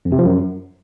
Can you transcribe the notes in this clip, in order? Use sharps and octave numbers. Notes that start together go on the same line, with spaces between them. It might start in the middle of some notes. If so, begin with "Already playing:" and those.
F2
C3
F3
F#2